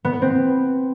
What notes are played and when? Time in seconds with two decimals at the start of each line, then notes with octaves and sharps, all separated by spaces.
0.05 B3
0.13 B4
0.22 C4